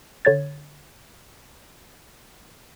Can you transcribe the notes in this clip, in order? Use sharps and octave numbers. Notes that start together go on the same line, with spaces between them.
D3 C#5 G#6 A6